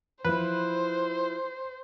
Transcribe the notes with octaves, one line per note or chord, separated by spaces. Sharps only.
F3 E4 B4 C5